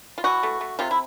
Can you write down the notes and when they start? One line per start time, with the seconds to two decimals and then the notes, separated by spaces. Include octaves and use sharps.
0.18 F4
0.24 E3 F#4
0.43 A3
0.61 A3
0.79 C3 F4
0.91 E4